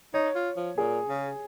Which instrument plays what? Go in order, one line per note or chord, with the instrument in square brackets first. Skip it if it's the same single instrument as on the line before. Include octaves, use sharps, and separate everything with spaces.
[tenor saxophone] D#4 [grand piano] C#5
[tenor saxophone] F4
F3
[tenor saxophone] A#2 [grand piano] G#4
[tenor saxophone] C#3